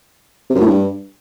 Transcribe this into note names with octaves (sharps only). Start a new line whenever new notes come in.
C3
F#2
A2
G2